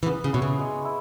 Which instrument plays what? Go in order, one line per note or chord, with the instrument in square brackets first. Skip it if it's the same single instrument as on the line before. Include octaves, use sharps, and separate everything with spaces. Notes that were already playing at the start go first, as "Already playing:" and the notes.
[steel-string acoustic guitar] E3
[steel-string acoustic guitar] C#3 [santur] B3
[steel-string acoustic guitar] C#3
[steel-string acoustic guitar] B2 [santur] E4 C#5
[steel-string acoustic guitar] C#3
[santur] G#3
E4